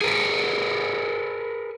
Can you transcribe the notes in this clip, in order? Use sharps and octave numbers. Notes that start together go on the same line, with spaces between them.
G#4 A#4 B4